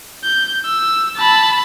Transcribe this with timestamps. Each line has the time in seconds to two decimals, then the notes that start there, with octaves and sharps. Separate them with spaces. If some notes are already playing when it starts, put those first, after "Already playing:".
0.24 G6
0.65 E6
1.18 A5 B5